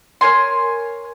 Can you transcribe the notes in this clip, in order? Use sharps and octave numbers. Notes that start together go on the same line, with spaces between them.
A#4 C#5 G#5 C6